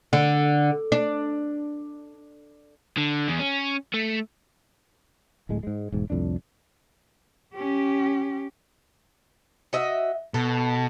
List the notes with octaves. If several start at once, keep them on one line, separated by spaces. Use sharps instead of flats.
D3
D4
D3
E2
C#4
A3
D1 A2 G#3
G#2 G#3
E1 G#2
C2 F2 A2 D4
C#4 G4
F#4 D#5 E5
B2 A4